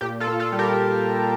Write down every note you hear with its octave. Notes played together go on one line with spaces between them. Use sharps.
A#2 G4
F4 A4
A#2
F4 A4
G3
G4 A#4